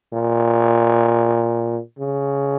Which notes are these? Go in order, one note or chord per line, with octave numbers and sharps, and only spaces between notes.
A#2
C#3